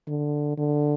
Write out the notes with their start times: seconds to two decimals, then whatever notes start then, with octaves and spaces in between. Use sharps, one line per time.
0.08 D3
0.58 D3